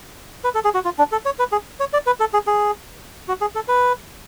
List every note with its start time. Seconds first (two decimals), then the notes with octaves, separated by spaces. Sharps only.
0.44 B4
0.55 A4
0.64 G#4
0.74 F#4
0.85 F4
0.98 D4
1.12 A4
1.25 C#5
1.39 B4
1.52 G#4
1.80 C#5
1.93 D5
2.06 B4
2.20 A4
2.33 G#4
2.47 G#4
3.28 F#4
3.41 G#4
3.55 A4
3.68 B4